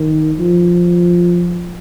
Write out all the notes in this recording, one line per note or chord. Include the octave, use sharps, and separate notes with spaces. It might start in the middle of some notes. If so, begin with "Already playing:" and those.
Already playing: D#3
F3